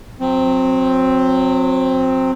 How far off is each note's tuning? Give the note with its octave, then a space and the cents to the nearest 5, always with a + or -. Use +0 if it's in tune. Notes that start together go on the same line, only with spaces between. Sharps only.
F#3 -25 C4 +5